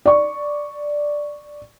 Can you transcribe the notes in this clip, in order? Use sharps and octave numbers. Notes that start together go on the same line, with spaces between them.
D5 C#6